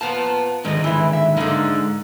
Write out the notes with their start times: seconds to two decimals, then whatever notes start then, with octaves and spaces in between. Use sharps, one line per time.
0.01 A#2 B3 F5 A5
0.65 G#2 D3 D#3 G#3 D#5
0.84 E3 E4
1.13 E5
1.37 D3 G#3 A#3 D#4